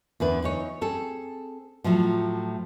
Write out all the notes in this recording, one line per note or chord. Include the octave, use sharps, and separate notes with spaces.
E2 D3 B4
E3 D#4 C#5
C4 G#4 A4
A2 F3 F#3 A3